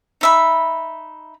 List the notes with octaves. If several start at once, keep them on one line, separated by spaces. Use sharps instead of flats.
D#4 E5 B5